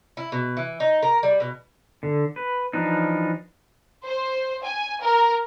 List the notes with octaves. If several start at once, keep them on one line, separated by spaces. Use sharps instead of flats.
E4
B2
E3
D#4
A#4
G3
B2
D3
B4
E3 F3 D4 D#4
C5
G#5
A#4